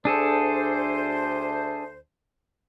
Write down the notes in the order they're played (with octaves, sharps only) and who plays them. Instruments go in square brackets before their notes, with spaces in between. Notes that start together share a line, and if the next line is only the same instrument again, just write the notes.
[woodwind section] D2 C5 [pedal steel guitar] D4 G#4 A4